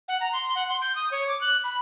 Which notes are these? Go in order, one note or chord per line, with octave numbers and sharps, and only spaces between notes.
F#5
A#5
C6
F#5
C6
G6
D#6
C#5
D6
F#6
B5